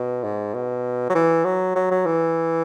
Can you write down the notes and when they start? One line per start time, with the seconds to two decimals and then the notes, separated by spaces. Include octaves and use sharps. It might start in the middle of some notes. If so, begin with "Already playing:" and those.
Already playing: B2
0.24 G#2
0.54 B2
1.10 F#3
1.15 E3
1.45 F#3
1.75 F#3
1.91 F#3
2.06 E3